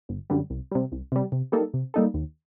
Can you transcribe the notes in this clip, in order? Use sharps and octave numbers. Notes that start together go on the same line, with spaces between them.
G1
F#2 D3 G3
C2
C3 G3
C2
C3 G3
C3
G3 A#3 D#4 A4
C3
G3 A#3 D#4 A4
D#2